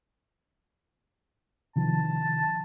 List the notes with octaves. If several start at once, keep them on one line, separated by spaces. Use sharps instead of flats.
C3 D#3 F3 A5